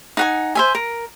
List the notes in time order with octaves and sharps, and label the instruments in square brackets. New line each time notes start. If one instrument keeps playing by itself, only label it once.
[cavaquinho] D#4 F#5 G#5
C5 E5 G#5
A#4